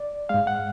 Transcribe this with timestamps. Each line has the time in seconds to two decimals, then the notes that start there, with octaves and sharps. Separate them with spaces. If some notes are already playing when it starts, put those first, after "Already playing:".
Already playing: D5
0.29 G#2 G#3 F5
0.47 F#5